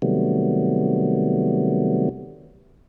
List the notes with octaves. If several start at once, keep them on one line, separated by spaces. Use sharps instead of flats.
C3 D#3 F#3 G3 A3 B3